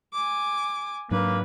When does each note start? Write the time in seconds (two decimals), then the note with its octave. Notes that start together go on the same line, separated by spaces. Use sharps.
0.13 G#5 D6
1.11 G#2 F#3 A#3 D4 B4